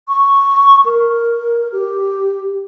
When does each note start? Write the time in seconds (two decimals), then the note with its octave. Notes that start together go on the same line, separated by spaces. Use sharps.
0.08 C#6
0.85 A#4
1.72 G4